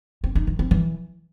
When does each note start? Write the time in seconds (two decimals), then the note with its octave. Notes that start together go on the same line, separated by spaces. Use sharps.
0.24 C4
0.35 D#4
0.47 D#3
0.59 C4
0.71 E3